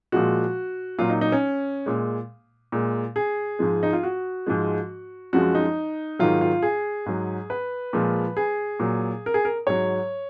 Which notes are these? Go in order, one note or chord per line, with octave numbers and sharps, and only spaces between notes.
A#2 F3 G#3 F#4
A#2 F#3 F4
D#4
D#4
C#4
A#2 G#3
A#2 G#3
G#4
G#2 F3 G#3
D#4
F4
F#4
G#2 F3 G#3
F#2 F3 G#3 F#4
D#4
G#2 D#3 F#3 F4
F4
G#4
G#2 F#3
B4
A#2 F3 G#3
G#4
A#2 F#3
A#4
G#4
A#4
G#2 F#3 C#5